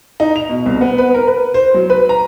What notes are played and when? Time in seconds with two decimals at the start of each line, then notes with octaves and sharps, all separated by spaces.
0.20 D#4
0.36 F7
0.49 B2
0.66 C2
0.81 B3
0.98 B4
1.14 A#4
1.28 B4
1.54 C5
1.74 F#3
1.90 B4
2.09 A#5